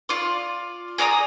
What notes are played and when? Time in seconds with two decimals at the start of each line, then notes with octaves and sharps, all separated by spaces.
0.09 F4 D5
0.98 G#4 D5 A#5 D#6